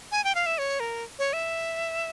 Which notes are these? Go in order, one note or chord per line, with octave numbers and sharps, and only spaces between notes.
G#5
G5
F5
E5
C#5
A#4
C#5
E5